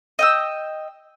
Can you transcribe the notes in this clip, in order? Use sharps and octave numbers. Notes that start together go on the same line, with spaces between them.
D#5 G5 E6